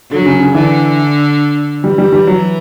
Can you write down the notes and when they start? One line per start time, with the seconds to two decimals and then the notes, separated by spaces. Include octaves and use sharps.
0.11 D3 F#3
0.26 C#3
0.40 C#3
0.55 D3 E3
1.83 E3 G3
1.98 G3
2.12 G3
2.27 F#3